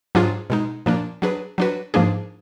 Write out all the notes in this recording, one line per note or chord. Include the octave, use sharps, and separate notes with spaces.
G#2 F#3 D4 F4 G#4
B2 G#3 D#4
A#2 F3 A#3 D4
F#3 D4 G#4 B4
F#3 D4 F#4 B4
G#2 F3 A#3 D4 G#4